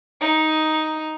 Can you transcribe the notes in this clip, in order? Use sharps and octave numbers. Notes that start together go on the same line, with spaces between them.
D#4